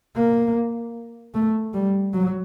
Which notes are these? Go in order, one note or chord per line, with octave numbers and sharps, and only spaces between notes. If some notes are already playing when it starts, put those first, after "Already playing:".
A#3
A3
G3
F#3